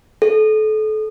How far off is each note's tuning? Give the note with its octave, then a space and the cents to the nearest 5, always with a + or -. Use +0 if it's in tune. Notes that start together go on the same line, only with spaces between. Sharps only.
A4 -30